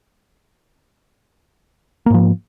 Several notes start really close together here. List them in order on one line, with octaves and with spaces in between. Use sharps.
A#3 G#2 F3